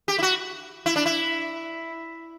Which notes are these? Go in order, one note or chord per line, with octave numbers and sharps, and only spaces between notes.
G4
E4
F#4
E4
D4
E4